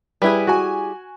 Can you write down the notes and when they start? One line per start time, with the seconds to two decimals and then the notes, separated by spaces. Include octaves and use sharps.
0.22 G3 E4 G#4 B4
0.47 F#4 G#5